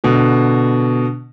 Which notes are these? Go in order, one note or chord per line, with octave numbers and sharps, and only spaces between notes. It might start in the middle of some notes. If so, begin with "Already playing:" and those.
B2 D3